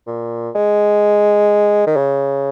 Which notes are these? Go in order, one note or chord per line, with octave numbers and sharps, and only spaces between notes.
A#2
G#3
D#3
C#3